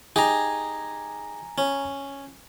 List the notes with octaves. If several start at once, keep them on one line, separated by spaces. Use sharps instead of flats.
D#4 G4 G#4 G#5 A#5
C#4